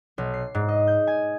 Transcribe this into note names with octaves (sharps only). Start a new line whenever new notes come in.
B1
C7
G#2
D#5
G6
G#5